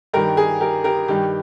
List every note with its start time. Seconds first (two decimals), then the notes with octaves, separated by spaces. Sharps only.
0.14 G2 D#3 G4 A#4
0.37 G#4
0.61 G4 A#4
0.84 G4 A#4
1.08 G2 D#3 G4